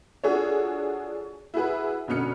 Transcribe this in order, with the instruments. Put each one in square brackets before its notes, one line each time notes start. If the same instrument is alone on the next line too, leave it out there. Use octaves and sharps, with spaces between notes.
[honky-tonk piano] D4 F4 F#4 G#4 A4 C#5
E4 F#4 G#4 B4
F1 B2 D3 C#4 F6 C#7